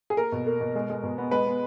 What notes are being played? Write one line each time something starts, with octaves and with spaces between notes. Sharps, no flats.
G#4
A#3 A#4
B2
A#3
B2
G#3
G#3
B2
B3
G#3 B4
B3